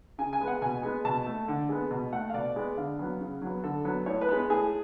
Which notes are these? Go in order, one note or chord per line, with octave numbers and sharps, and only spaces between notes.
C#3 G#5
G#5
G#3 B3
F#5
B2 G#5
G#3 B3
B2 A5
A3
D3
G#3 B3
B2
A3 F#5
F5
B2 D5
G#3 B3
D3 F5
F#3 B3
C#3
F#3 B3
D3 A4
F#3 B3
A2 C#5
B4
G#3 B3
A2 G#4